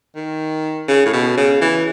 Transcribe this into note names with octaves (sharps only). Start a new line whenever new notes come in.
D#3
C#3
A2
B2
C#3
E3